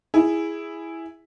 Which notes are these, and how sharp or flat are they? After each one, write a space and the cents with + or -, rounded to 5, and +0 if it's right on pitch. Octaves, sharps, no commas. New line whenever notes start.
E4 +0 G#4 -5